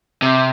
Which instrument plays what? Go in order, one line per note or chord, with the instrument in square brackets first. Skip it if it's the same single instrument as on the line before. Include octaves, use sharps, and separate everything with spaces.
[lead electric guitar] C3